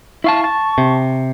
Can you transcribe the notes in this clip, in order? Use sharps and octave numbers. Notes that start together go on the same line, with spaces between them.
E4 F5 A5 C#6
A5
C3